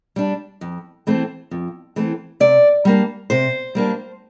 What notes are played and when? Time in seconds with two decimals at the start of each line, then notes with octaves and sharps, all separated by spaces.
0.16 G3 D4
0.61 F2
1.07 E3 A3 C4
1.51 F2
1.96 E3 A3 C4
2.40 C3 D5
2.85 G3 A#3 D4
3.30 C3 C5
3.75 G3 A#3 D4